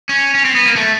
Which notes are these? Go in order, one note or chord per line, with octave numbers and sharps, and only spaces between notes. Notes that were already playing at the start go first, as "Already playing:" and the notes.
C#4
C#4
C4
B3
A#3
A3